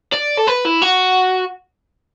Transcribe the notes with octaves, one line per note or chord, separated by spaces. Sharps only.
D5
A4
B4
E4
F#4